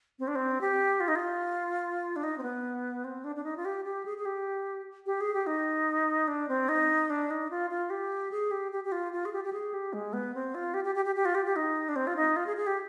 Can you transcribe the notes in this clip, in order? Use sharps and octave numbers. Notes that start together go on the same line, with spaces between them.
C4
D4
C4
G4
F4
D#4
F4
D4
D#4
C4
B3
C4
D4
D4
D#4
F4
G4
G4
G#4
G#4
G4
G4
G#4
G4
D#4
D4
C4
D#4
D4
D#4
F4
F4
G4
G#4
G4
G4
G4
F4
F4
G#4
G4
G4
G#4
G4
G#3
B3
C4
F4
G4
G4
G4
G4
G4
F4
G4
G4
D#4
D4
C4
F4
D#4
F4
G#4
G#4
G4